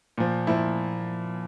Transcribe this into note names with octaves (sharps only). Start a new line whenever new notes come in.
A#2 F3
A#2 F3 E4